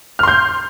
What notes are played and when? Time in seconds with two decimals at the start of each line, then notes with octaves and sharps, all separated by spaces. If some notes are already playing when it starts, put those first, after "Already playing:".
0.19 F6
0.23 C6
0.28 G6